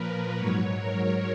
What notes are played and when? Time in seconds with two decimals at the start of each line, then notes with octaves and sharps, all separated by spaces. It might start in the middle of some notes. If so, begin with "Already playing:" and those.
Already playing: A#2 F3 A#4 B4
0.37 G#2 F#3 C#5
0.79 A#4